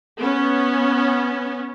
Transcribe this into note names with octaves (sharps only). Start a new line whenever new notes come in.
B3 C#4